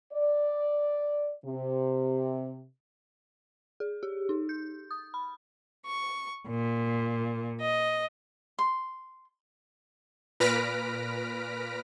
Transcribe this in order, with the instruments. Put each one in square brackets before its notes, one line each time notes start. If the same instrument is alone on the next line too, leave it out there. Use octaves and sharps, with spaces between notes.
[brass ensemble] D5
C3
[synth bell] G#4
G4
D#4
G6
D#6
B5
[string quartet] C#6
A#2
D#5
[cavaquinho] C6
[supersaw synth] A#2 B4 F6 A#6 B6 D7